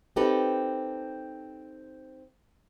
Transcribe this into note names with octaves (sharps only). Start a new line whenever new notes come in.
C4 D#4 G4 A4 B4